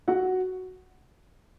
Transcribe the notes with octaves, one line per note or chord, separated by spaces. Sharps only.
F#4 F#5